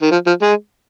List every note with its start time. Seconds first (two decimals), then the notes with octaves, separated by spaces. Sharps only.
0.02 D#3
0.12 F3
0.27 F3
0.42 G#3